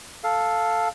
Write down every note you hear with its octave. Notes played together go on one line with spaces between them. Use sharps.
A4 F5